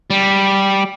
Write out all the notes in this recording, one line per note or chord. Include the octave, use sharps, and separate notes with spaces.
G3